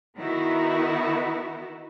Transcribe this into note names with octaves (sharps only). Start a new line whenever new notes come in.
D#3 B3 D#4 E4 F#4